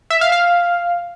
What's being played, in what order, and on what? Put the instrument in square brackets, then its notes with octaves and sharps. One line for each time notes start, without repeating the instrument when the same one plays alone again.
[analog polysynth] E5
F5
F5